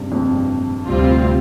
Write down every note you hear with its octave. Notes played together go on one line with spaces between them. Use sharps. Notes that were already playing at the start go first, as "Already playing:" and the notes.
Already playing: G2 C3
F2
G2
C3
D2 A2 C3 G3 C4 F4